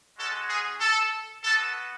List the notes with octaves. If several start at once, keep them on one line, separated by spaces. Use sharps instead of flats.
G#3 C#4 F#4 A4
G#4
A4
B3 F#4 A4